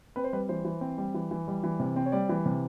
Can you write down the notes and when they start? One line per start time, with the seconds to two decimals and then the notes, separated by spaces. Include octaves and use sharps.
0.16 C4 B4
0.24 C5
0.33 G3 B4
0.49 E3 C5
0.65 E3
0.81 C4
0.98 G3
1.15 E3
1.31 E3
1.48 G3
1.64 E3
1.80 C3
1.96 C4
2.06 C#5
2.12 G3 D5
2.29 E3
2.46 C3